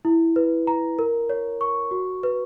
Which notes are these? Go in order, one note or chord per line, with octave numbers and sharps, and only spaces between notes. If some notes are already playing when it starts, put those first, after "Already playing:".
E4
B4
A#5
A#4
C#5
C#6
F#4
B4